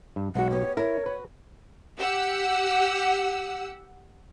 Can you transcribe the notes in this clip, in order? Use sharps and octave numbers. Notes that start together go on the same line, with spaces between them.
G2
B1 G#3 F#4 F#5
B3 G4 C#5
E4 A#4 C#5
F#4 B4
G4 F#5 E6